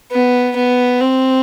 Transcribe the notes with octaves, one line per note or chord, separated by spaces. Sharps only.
B3
B3
C4